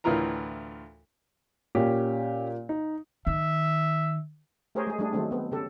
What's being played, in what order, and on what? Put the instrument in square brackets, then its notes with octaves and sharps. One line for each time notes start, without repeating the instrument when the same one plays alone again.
[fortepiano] D2 A2 E3 F4 A#4 A#5
[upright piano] A#2 [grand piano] C#4 G4
[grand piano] D#4
[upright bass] D#3 [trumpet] E5
[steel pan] A3 G4 G#4 A#4 C5 C#5
G#3 G#4
G3 A3 D4 G#4
D#3 F#3 G#3 A3 C4 D4
B3 C4
C#3 G4 A4